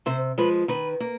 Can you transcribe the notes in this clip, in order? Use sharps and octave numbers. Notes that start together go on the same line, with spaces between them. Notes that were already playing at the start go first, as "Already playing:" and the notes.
C3 C5
F3 G#3 B4
D#3 B4
A#3